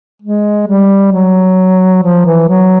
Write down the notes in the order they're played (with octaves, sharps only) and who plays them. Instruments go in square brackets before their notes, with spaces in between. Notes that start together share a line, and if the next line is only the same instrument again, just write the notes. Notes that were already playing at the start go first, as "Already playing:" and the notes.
[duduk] G#3
G3
F#3
F3
E3
F#3